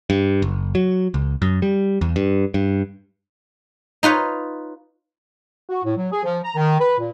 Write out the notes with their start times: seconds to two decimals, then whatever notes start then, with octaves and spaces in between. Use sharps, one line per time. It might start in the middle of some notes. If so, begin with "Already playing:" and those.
0.10 G2
0.42 F#1
0.75 F#3
1.14 C#2
1.42 F#2
1.62 G3
2.01 E2
2.16 G2
2.54 G2
4.03 D#4 F4 B4 C#5
5.69 F#4
5.84 A2
5.97 F#3
6.12 G#4
6.24 F3
6.44 A#5
6.56 D#3
6.80 B4
6.98 A#2